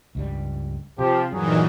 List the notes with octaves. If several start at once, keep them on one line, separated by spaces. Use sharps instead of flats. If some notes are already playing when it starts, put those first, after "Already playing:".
C#2 G2 G3
C3 F3 G4
G2 A#2 D#3 E3 F#3 G#4